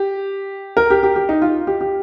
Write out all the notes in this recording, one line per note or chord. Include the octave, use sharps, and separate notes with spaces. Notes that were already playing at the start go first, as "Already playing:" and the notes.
Already playing: G4
A#4
G4
G4
G4
D#4
F4
G4
G4